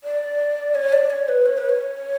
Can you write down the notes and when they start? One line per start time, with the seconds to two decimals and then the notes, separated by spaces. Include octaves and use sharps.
0.04 D5
0.75 C#5
0.93 D5
1.10 C#5
1.28 B4
1.46 C#5
1.58 B4
1.69 C#5